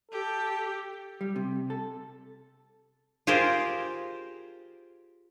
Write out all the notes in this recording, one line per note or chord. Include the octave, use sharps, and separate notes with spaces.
G4 A4
G3
C3
A4
F4 G4 G#4 A#4 C5